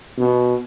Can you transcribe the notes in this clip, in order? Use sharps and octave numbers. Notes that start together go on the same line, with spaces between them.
B2